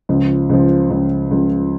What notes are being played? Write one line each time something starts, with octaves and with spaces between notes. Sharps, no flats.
C#2 C#3 F3
C#2 C#3 F3
C#2 C#3 F3
C#2 C#3 F3